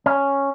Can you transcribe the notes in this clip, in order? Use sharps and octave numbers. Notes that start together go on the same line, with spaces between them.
C#4